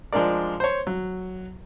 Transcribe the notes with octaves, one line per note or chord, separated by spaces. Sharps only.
F3 G#3 D4 A#4 D5
C5 C#5
F#3